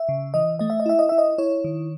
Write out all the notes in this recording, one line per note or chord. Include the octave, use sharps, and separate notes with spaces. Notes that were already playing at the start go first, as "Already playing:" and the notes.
Already playing: E5
C#3
E3 D#5
A3 D#5
E5
D#5
E4 E5
D#5
E4 E5
D#5
E4 C#5
D#3